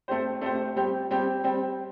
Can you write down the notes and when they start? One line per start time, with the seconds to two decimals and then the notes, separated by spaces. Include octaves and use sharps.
0.08 A3 C4 G4 C5
0.41 A3 C4 G4 C5
0.76 G3 C4 G4
1.10 G3 C4 G4
1.44 G3 C4 G4